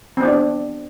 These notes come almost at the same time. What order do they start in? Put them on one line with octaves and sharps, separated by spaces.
C4 B3 D4